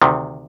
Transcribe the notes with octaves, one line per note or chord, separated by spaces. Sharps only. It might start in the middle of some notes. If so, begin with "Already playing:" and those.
D2 C3 D#3